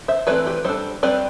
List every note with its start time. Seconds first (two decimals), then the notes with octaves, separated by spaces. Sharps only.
0.08 C5 E5
0.27 E3 A3 C4 B4 D5
0.46 G4 B4
0.65 G3 D4 A4 C5
1.03 G3 C4 B4 D5